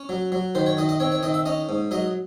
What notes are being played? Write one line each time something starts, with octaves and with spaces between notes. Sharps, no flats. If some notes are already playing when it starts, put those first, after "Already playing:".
Already playing: C#4
F#3
F#3
D#3 C5
C#5
D#3 D#5
D#5
C4 C#5
C#5
D#3 D#5
E5
C#4 D#5
G#2
F#3 D#5